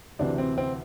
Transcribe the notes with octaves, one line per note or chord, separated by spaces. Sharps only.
D2 C3 E3 D4
C4
C4